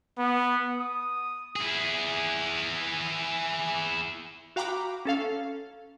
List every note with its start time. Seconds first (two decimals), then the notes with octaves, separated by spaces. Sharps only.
0.18 B3
0.79 D#6
1.56 E4 G#4
4.56 F#4 F5 G5 A#5 B5 D6
5.05 C#4 A4 F5